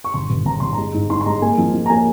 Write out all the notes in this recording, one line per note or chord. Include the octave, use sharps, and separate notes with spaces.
C#6
G1 C6
G1
G1 A#5
G1 C6
G#3 A#5
G#2
G#2 C6
C6
G#3 A#5
A#3 G#5
F3
F3
A#5
A#3 G#5